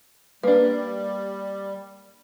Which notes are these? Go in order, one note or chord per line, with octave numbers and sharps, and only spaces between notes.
G3 A#3 D4 B4